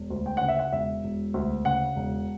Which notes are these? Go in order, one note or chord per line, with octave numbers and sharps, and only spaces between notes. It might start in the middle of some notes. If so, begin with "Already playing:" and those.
Already playing: E1
D2
G5
C#3 F#5
E5
F#5
E1 E5
E1
D2
C#3 F#5
E1